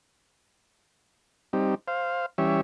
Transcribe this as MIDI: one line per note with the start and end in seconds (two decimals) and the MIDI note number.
1.53 1.75 55
1.53 1.75 60
1.53 1.75 63
1.53 1.75 67
1.88 2.26 72
1.88 2.26 77
2.38 2.61 52
2.38 2.61 55
2.38 2.61 61
2.38 2.61 67
2.38 2.61 73
2.38 2.61 76